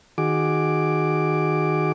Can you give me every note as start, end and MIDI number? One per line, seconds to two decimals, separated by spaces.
0.18 1.92 51
0.18 1.92 66
0.18 1.92 68
0.18 1.92 86